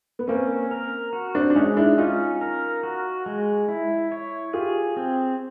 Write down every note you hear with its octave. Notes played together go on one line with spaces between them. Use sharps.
B3
A#3 C4 C#4
A#4
F#4
C4 D4
D4
G#3 C#4 D#4
D4 E4
C#4 D#4 F4
A#4
F#4
G#3
E4
C#5
F4 G4 G#4
C4